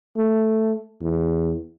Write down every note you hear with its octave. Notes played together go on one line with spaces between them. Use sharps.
A3
E2